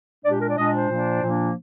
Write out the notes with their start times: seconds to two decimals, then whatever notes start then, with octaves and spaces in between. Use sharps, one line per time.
0.24 A#2 G#3 D4 D5
0.32 G4
0.41 A#4
0.49 D5
0.57 A#2 G#3 D4 D#5
0.73 C5
0.89 A#2 F3 A#3 D4
1.21 A#2 F3 A#3 D4